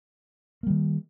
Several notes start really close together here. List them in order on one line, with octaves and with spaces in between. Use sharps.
A#3 G3 D#3